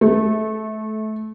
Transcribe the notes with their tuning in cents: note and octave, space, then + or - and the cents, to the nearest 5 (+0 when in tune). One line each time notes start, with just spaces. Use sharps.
A3 -20